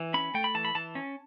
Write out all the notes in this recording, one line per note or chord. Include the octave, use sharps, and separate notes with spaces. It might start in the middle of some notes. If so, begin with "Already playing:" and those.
Already playing: E3
C#4 B5
A3 G5
B5
E3 A5
B5
E3 A5
C#4